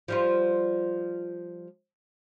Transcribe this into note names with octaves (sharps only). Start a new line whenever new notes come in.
F3 G3 F4